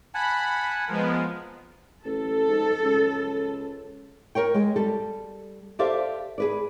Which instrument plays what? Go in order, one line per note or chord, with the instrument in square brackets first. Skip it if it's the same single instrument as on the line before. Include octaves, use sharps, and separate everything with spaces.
[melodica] F#5 G#5 A5 [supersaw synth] B5
[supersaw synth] F3 G#3 B3 [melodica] A#4
[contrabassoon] A1 [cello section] A4
[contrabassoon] G#2
C#2
[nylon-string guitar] A#4 C#5 G5
G#3
G3 A4
G4 A4 C5 D5 E5 F5
G#4 B4 D5